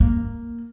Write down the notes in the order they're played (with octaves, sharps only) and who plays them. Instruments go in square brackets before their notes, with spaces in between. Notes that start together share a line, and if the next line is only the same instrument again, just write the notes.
[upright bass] A#3